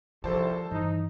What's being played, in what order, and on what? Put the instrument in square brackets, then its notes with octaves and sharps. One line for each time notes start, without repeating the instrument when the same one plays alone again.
[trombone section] C2 [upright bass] F3 [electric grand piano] A4 C5 A5
[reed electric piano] G2 E3 [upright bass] D#3 [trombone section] D#4